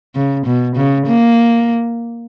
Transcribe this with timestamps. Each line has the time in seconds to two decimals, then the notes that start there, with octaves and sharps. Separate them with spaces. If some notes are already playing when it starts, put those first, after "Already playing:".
0.16 C#3
0.46 B2
0.76 C#3
1.07 A#3